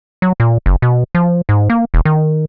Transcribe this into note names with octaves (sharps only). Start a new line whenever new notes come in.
F#3
A#2
F#1
B2
F3
G#2
A#3
E1
D#3